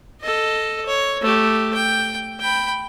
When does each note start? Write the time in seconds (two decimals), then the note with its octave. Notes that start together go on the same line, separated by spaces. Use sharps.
0.22 A4 D#5
0.86 C#5
1.22 A3 G4
1.74 G5
2.40 G5 B5